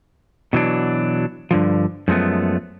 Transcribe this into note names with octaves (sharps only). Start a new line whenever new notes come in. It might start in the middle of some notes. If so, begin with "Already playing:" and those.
B2 E3 F#3 D4
G2 D3 F3
F#2 F3 G#3 A3 B3